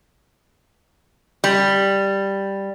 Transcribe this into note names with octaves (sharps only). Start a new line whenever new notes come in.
G3